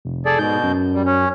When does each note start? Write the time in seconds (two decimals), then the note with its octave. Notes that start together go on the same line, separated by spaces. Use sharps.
0.05 F1
0.26 G#4 A4 D5
0.39 G#2 B2 G6
0.63 F#2
0.94 G3
1.06 C#4